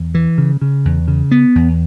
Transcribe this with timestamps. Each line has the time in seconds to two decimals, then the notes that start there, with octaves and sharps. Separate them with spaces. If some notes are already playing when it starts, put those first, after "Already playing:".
Already playing: E2
0.14 E3
0.38 C#3
0.61 C#3
0.85 E2
1.08 C#3
1.31 B3
1.55 E2